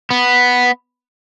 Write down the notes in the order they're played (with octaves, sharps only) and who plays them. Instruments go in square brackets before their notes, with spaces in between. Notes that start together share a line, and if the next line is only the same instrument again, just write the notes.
[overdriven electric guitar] B3